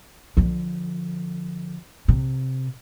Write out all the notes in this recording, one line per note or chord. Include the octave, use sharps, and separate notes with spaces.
D3 F3
C3